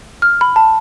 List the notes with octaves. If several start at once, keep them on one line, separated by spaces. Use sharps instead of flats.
F6
B5
A5